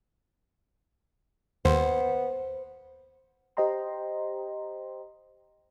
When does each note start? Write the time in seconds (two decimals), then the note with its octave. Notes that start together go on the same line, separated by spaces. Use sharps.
1.65 D#2 B3 C5
3.57 G4 C5 D#5 G5 A#5 C6